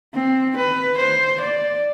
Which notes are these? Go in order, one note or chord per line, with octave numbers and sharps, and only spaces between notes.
C4
B4
C5
D5